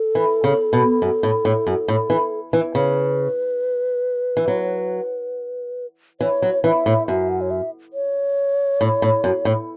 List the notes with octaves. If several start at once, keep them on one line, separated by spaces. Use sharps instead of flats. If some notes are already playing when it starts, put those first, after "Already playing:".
Already playing: A4
E3
C#3
B2
F#2
A2
A2
F#2
A2
E3
E3
C#3 B4
E3
F#3
E3 C#5
F#3
E3 E5
A2
F#2 E5
F#5
C#5
E5
C#5
A2
A2
F#2
A2